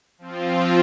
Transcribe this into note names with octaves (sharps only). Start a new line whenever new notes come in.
F3 C4 F4